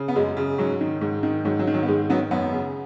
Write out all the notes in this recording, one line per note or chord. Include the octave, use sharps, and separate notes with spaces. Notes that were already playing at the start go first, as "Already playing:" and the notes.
Already playing: C#3
B3
F#2 G#3
C#3
G#2 F#3
D#3
G#2
D#3
G#2 F#3
F#3
D#3
F#3
B3
G#2 G#3
D#3 F#3 B3
F#2 F#3 B3
C#3